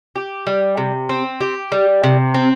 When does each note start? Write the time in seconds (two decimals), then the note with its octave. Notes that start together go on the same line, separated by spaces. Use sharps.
0.16 G4
0.47 G3
0.77 C3
1.09 C4
1.41 G4
1.72 G3
2.03 C3
2.34 C4